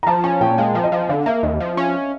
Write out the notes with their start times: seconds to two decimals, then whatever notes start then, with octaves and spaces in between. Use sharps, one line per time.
0.03 A#5
0.07 F3 A5
0.24 C#4 G#5
0.41 A#2 G5
0.58 G#3 F5
0.75 F3
0.84 D#5
0.92 F3
1.09 D3 F5
1.26 A#3 E5
1.43 D#2 D#5
1.60 F3
1.77 C#4